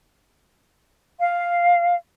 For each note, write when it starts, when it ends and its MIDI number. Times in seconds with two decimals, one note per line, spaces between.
1.19 1.94 77